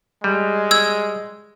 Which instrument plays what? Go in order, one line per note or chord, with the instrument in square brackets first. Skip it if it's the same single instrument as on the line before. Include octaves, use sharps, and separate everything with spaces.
[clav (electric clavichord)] G3 [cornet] G#3
[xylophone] E6 G#6